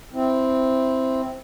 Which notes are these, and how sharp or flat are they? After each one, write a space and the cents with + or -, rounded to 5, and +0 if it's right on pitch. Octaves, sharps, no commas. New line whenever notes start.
C4 +0 E4 +0